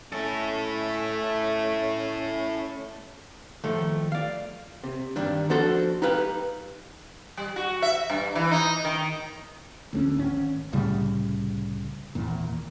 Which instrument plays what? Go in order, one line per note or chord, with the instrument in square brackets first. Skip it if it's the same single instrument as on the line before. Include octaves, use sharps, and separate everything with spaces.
[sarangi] A3 [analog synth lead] C#4 [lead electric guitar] E4 A4
[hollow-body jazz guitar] D#3 F3 A3
D5 F5
C3
G2 D#3 G3 D4
F3 D4 F#4 A4 C5
D#4 G4 B4 F5
[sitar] G3
F#4
E5
G2
E3
D#4
D#3
[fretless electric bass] D2 G3 C#4
G#1 C#4
C2 A2 C#3 G3
G#1 E2 A#2